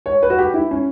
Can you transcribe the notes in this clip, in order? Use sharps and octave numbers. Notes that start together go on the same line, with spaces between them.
C#5
B4
F#4
G4
E4
C#4